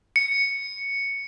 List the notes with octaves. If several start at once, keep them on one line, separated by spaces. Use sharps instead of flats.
C#7